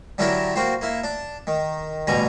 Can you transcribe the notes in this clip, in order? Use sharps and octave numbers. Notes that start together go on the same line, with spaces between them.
D3 F#3 D4 E4 G4 A#4
A#3 F#4 G4 C5
A#3 E4
D4
D#3
A1 B2 D3 G3 G#5 A#5